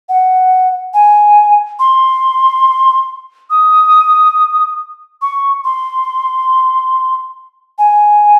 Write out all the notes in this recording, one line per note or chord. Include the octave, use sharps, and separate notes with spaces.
F#5
G#5
C6
D#6
C#6
C6
G#5